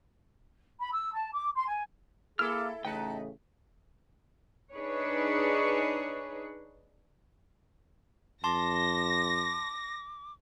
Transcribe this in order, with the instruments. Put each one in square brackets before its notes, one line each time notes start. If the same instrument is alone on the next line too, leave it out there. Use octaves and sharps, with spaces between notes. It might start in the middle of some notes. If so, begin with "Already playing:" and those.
[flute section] B5
E6
A5
D6
C6
G#5
[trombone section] A#3 G#4 [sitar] E4 A4 [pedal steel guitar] D6 E6 F6
[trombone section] A1 C#3 A3 [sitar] D#4 B4 [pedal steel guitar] G5 A5
[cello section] D4 D#4 G#4 B4 C#5
[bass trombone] F2 [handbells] A5 C6 [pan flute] D6 [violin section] A#6